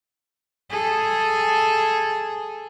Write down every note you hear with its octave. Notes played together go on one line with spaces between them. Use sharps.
G#4 A4